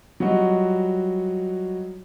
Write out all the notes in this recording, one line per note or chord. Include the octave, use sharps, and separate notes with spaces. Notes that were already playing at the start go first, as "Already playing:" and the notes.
F#3 G3 F4 F#4 D#5